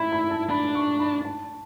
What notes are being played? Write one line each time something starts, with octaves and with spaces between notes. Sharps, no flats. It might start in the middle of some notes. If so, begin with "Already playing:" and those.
Already playing: E4 B5
B5
A5
D4 B5
C#6
B5
A5